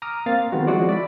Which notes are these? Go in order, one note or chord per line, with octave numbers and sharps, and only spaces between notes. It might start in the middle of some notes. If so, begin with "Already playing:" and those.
A#5 D6 D#6 F6
A#3 C4 F5 A6
D#3 G#3 B3 C4 F#4
F3 G#3 E4 F#4 C#5 D5
D5 E5 B5